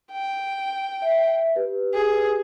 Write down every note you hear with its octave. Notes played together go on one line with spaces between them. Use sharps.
G5
E5
G4 B4
G#4